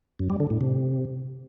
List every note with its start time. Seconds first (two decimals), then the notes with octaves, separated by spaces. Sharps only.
0.19 F#2
0.30 G3
0.40 D3
0.50 A2
0.61 C3